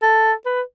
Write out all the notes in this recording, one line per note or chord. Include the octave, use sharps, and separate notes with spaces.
A4
B4